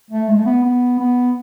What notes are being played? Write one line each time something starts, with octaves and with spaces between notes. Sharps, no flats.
A3
G#3
A3
B3
B3
B3